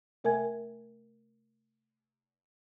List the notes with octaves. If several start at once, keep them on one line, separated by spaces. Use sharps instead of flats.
C3 A3 A#4 E5 G#5 G#6